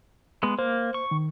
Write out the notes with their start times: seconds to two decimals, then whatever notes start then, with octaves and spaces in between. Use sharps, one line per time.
0.43 G#3 B3
0.59 A#3 C5
0.94 C#6
1.11 D#3